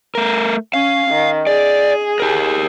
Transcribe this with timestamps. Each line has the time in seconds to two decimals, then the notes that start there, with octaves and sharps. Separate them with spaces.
0.15 A3 A#4
0.74 C#4 F5
1.10 D#3
1.47 G#4 D5
2.20 G4 A#4